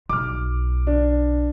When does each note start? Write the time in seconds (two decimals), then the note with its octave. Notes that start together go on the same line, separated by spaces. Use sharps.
0.09 B1 D6 F6
0.87 D4